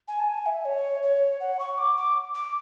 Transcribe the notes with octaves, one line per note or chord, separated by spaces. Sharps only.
G#5
A5
G#5
E5
C#5
C#5
F#5
C#6
D6
D6
D6